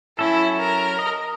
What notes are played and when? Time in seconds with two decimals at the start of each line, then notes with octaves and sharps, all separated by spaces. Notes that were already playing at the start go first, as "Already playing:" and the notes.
0.19 F#3 C#4 E4 A4
0.59 A#4
0.99 D#5